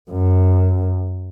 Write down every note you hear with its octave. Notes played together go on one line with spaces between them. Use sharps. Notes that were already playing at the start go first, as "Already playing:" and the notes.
F#2